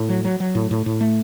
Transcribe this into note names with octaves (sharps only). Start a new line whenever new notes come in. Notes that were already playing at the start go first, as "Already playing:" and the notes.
Already playing: A2
F#3
F#3
F#3
A2
A2
A2
A3